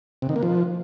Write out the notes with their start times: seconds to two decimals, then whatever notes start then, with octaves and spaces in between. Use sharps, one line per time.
0.22 C3
0.29 D#3
0.36 A#3
0.43 F3